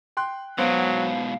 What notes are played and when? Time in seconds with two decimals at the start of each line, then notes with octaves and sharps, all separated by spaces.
0.17 G5 C6 F#6
0.58 G#2 B2 F#3 B3 C5 F5 D7